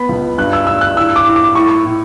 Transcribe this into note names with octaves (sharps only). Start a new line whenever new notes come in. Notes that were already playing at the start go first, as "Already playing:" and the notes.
Already playing: B3 B5
C#2
G2 F#6
E6
G2 E6
F#6
A2 E6
D6
A2
D6
A2 C#6
A2